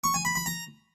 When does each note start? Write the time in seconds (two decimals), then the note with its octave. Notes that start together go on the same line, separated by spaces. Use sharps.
0.04 C#6
0.14 G#5
0.25 B5
0.35 B5
0.46 A#5